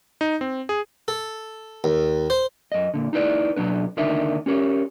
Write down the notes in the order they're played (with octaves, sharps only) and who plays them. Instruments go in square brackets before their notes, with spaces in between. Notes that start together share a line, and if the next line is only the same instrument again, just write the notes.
[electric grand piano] D#4
C4
G#4
[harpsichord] A4
D#2
C5
[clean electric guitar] F#2 D#5
A#2 D3
D#4 E4 B4 D5
B2 F#3 D4 B4
D#2 D3 D4 D#4 A#4 E5
C#4 G4 A#4 C#5